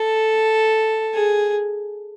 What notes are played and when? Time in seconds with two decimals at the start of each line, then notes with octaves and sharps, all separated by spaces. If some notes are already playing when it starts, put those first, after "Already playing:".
Already playing: A4
1.14 G#4